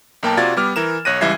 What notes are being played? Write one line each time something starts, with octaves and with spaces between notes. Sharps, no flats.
B1 A#3 G5 A5
C3 F4 F#4 D5 G#6 A6
G3 B3 D6 F6
E3 A#4 E7
B1 C#5 F#6 A#6 D#7
C#2 E3 G3 E5 G#6 C7